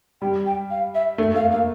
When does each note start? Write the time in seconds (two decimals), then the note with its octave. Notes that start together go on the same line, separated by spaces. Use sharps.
0.21 G3 G5
0.45 G5
0.70 F5
0.94 E5
1.18 A3
1.34 A3 F5
1.50 A#3 F5